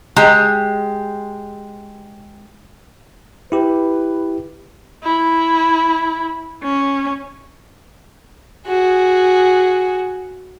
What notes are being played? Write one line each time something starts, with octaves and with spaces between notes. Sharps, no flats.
G#3 G4 A#5
E4 G4 B4
E4
C#4
F#4 G#4